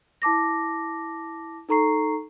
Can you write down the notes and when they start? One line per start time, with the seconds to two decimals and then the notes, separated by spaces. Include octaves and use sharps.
0.22 E4 A5 D6 A#6
1.69 D#4 A4 A#5 C#6 C7